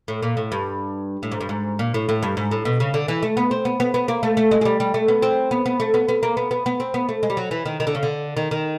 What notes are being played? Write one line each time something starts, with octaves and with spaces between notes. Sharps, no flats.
A2
A#2
A2
G2
A2
G#2
G2
G#2
A#2
A2
A2
G2
G#2
A2
B2
C#3
D3
E3
A3
B3
C4
B3
B3
B3
A#3
A3
A3
G#3
G#3
G3
G3
A3
B3
C4
B3
B3
A3
B3
B3
A#3
B3
B3
B3
C4
B3
A3
G#3
G3
F#3
E3
D#3
D#3
D3
C#3
D3
D#3
D#3